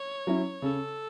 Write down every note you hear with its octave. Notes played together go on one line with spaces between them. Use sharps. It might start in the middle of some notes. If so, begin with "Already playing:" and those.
Already playing: C#5
F#3 C#4 E4
C#3 A4